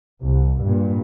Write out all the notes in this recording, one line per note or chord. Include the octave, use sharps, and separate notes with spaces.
C2
G2 A#2